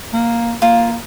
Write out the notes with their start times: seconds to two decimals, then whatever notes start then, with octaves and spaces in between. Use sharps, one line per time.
0.14 A#3
0.62 A#3 F4